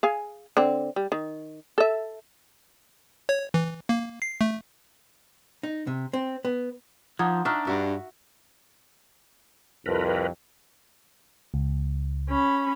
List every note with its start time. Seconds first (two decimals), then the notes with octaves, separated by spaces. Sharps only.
0.03 G#4 F5 G#5
0.57 D3 C4
0.96 G3
1.12 D#3
1.78 A4 E5
3.29 C#5
3.54 E3
3.89 A#3
4.22 C7
4.41 A3
5.63 D#4
5.87 C3
6.13 C4
6.45 B3
7.19 F3 D4 D#4 F4 F#5 D#6 G#6
7.45 D4 D#4 E5 C#6 F6 F#6
7.67 G2 F#4 E5
9.86 C2 F2 A#4 B4
11.54 C#2
12.29 C#4 B5